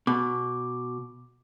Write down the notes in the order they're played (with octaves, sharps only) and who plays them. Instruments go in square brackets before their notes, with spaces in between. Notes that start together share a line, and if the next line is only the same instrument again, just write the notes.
[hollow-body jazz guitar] B2 [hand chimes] D6